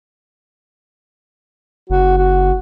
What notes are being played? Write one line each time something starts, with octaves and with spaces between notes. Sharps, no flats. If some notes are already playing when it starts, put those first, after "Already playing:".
F#1 F#4
F#4